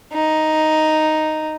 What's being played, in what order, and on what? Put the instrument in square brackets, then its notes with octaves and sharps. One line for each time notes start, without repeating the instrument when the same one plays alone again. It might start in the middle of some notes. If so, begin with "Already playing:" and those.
[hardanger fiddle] D#4